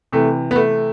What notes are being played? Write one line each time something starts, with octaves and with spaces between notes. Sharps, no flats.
C3 E3 A3
B3
A3